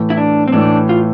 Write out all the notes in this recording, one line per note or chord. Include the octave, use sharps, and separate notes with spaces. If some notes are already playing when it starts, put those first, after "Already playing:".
Already playing: A2 E3 A3
E4
D4
C4
A2 E3 A3 D4
F4